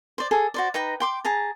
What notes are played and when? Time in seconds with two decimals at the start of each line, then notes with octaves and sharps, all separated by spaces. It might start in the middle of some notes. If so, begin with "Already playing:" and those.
0.18 C5 D5
0.31 G#4 A4 G#5
0.54 F#4 C5 D5
0.74 D#4 B4 G5 A#5
1.00 G5 C6 D6
1.25 G#4 A5 A#5